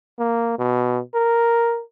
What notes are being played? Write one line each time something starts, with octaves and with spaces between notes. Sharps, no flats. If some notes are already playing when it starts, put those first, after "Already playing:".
A#3
B2
A#4